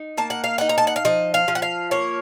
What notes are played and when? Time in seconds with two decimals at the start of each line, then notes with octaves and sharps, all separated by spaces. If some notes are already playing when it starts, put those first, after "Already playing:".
Already playing: D#4
0.18 A#3 A5
0.30 F#5
0.44 F5
0.58 D#4 F#5
0.69 A#5
0.78 A5
0.87 F#5
0.96 F5
1.05 F3 D#5
1.34 F5
1.48 F3
1.55 F#5
1.62 F5
1.91 A#3 C#5